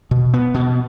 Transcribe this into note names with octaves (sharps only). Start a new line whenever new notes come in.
B2
B3
B2